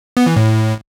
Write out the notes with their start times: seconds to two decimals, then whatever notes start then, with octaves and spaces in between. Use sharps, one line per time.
0.17 B3
0.27 E3
0.36 A2